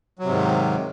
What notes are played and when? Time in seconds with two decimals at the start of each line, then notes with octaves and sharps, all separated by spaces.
0.19 F#3
0.24 C3
0.29 G#2
0.34 D#3